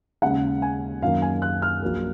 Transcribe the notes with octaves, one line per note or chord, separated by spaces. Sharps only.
D#2 C#3 G#3 C#4 F#5
G#5
F#2 D#3 A#3 F5
G#5
F#6
F6
A#1 A#2 F#3 A#3